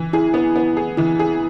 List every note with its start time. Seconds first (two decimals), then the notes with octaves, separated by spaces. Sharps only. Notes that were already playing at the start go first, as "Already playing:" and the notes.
Already playing: E3
0.13 E4 G#4
0.34 B3
0.56 B3
0.77 G#4
0.97 E3 E4
1.19 G#4